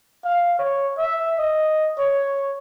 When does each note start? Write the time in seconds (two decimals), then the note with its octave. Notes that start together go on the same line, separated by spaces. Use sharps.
0.25 F5
0.59 C#5
0.98 E5
1.39 D#5
1.99 C#5